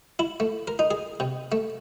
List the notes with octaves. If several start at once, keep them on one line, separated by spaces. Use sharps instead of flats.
E4
A3
A#4
D#4
G#4
C3
A3